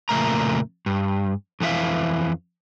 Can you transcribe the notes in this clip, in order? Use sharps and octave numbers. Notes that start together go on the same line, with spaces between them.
F2 A#2 C#3 A3 A#4 A#5
G2
F2 E3 B3 E5 F5